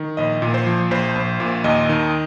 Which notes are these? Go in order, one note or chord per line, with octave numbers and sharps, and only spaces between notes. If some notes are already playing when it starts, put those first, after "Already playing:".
Already playing: D#3
A#1 D#5
A#2
C5
F3
A#1 C5
A#1
A#2
D#2 D#5
D#3